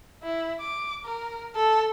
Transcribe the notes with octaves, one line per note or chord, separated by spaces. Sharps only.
E4
D6
A#4
A4